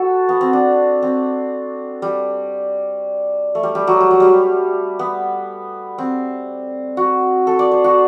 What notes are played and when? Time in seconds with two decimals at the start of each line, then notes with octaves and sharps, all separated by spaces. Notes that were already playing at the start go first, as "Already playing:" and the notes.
Already playing: F#4 A4
0.29 B3
0.41 C4
0.53 D4
1.03 C4
2.02 G3
3.55 A3
3.63 G3
3.75 G3
3.87 F#3
4.00 G3
4.11 F#3
4.20 G3
4.99 B3
5.98 C4
6.97 F#4
7.47 A4
7.59 D5
7.71 C5
7.84 F#4